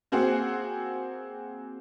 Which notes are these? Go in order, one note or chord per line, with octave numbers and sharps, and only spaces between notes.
A#3 C4 F#4 G#4 F#5